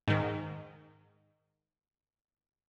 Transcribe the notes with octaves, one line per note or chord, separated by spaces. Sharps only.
G#2 D#3